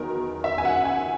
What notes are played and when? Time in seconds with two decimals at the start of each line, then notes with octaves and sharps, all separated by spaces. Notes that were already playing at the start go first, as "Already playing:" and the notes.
Already playing: E2 D#3 F#3 A#4
0.44 E5
0.58 G#5
0.65 F#5
0.85 G#5